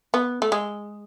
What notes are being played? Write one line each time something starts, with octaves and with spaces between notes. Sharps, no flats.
B3
A3
G#3